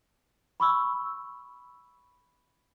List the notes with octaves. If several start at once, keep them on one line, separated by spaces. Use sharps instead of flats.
B5 C#6 E6